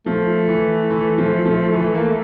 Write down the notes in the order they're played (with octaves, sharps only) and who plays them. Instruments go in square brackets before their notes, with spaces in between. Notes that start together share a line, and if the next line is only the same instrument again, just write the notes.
[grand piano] F3 [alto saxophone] A3
[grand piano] E3
E3
F3
F3
E3
A#3